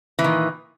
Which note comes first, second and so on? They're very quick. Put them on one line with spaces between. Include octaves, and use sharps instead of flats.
E3 A#2 D#3